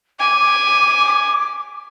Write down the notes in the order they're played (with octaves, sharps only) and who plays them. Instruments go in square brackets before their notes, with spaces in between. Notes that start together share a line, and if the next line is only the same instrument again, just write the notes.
[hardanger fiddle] G#5 [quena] D6